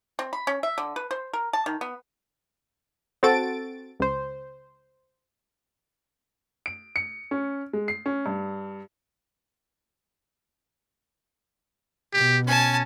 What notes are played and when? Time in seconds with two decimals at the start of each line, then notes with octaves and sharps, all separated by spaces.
0.19 C4
0.33 B5
0.47 C#4
0.63 E5
0.78 D3
0.96 B4
1.11 C5
1.33 A#4
1.53 A5
1.66 D#3
1.81 B3
3.23 C4 F#4 A4 A6 D7
4.00 C#2 C5
6.66 D7
6.96 C#7
7.31 C#4
7.73 G#3
7.88 C7
8.06 C#4
8.26 G2
12.13 B2 G4
12.47 C#4 G#5 A5